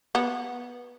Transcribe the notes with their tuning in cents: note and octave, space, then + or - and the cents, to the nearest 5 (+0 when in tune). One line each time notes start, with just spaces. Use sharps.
B3 -15